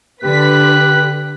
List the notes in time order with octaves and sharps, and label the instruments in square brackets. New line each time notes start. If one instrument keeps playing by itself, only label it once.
[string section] D3 B4 B6 [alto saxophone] G4 [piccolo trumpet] F#6